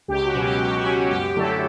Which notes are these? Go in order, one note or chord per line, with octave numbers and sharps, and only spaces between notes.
C#2 G4
F#4
B2 F#3 C#4
G4
C#2 G4
F#4
B2 F#3 C#4
G4
F#2 G4
D3 F#3 A3 E4 A4